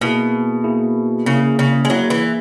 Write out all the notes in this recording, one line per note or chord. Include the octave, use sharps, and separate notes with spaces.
B2 A#3 E4 G#4
A#3 E4 G#4
C#3 A#3 E4 G#4
C#3
G#3
F#3 A#3 E4 G#4
E3